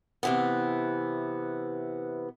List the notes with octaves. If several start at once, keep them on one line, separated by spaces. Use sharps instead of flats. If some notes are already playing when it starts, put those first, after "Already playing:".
C3 E3 B3